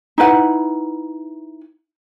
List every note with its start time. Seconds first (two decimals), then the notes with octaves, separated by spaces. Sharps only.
0.18 D#4 E4 B4 F#5